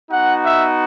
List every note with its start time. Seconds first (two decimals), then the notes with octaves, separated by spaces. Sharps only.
0.11 B3 D#4 F#4 F#5
0.44 E5